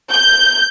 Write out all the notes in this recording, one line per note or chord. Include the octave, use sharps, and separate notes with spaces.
G6